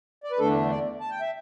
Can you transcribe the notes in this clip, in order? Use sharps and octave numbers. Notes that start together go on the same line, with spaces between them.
D5
B4
E2 D3 A3 D4 A4
D5
A5
G5
E5